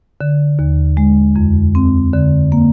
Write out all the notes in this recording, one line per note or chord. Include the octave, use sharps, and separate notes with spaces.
D3
D#2
G#3
F2
C4
D3
A#3